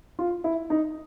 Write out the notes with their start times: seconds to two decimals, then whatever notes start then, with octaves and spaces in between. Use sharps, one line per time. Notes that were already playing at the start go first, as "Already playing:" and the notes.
0.19 F4
0.44 E4
0.70 D#4